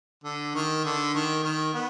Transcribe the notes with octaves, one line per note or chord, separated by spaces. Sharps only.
D3
D#3
D3
D#3
D#3
B3